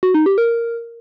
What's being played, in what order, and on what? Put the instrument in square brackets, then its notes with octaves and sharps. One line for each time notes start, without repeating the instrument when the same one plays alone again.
[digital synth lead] F#4
D#4
G4
A#4